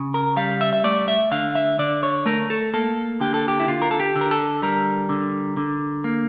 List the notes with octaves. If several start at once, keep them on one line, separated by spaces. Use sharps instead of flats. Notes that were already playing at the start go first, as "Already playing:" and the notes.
Already playing: C#3
A#4
G3 F5
E5
E5
A3 D5
E5
D3 F5
E5
D3 D5
C#5
A3 A#4
A4
A#3 A4
D3 G4
A4
G4
E4
D3 F4
A#4
A4
G4
D3
A#4
A4
G3 A#4
D3
D3
A#3